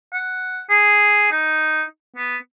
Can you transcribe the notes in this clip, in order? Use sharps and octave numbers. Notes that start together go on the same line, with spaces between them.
F#5
G#4
D#4
B3